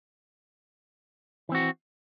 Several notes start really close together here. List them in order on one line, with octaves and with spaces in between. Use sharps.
E3 C4 F#4